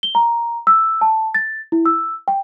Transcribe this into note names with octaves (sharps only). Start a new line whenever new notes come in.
G7
A#5
E6
A5
A6
E4
E6
G5